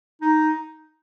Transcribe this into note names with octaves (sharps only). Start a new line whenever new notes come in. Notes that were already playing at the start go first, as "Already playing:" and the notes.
D#4